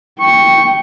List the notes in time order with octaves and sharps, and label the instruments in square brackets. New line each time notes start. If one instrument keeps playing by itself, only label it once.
[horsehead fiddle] G5 [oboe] C#6